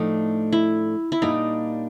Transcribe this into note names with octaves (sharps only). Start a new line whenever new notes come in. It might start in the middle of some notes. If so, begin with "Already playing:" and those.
Already playing: A2 F3 A3 D4 D#4
E4
E4
A#2 G3 A#3 D4 D#4